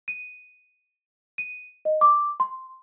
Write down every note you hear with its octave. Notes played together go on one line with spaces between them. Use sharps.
D#7
D#7
D#5
D6
C6